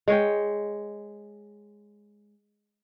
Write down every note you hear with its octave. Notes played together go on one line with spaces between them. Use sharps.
G#3 C#5 G5